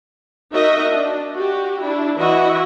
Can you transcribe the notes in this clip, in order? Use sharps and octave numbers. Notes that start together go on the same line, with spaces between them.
D#4 F#4 A#4 D#5 E5
D4
F#4 G4
D4 E4
E3 E4 F#4 D#5 E5